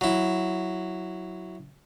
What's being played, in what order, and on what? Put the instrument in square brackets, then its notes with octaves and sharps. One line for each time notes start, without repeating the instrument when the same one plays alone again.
[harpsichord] F#3 E4